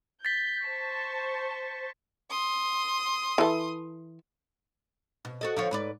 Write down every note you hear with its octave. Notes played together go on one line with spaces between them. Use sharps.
G6 A6 B6
C5 A5 C#6
C6 D#6
E3 A4
B2
F#4 A4 D#5
D3 F3 C#5
G#2 B4 D5